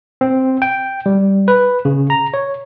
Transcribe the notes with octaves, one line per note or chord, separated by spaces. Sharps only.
C4
G5
G3
B4
C#3
A#5
C#5